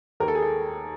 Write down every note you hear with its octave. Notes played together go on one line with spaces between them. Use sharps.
D#2 A#4
A4
G#4
A4